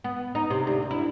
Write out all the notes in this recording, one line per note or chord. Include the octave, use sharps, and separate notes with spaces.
B3
D#4
C3
D2
E4